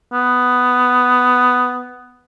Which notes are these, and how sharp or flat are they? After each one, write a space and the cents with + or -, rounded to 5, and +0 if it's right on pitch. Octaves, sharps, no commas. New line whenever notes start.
B3 +10